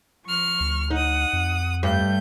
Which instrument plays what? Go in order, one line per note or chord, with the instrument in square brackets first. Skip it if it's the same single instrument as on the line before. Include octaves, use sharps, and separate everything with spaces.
[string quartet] F3 C#6 F6
[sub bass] D2
[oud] D#4 [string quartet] F#5 D#6
[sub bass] F2
[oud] G2 [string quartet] A3 G6